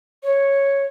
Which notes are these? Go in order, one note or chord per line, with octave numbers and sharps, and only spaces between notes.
C#5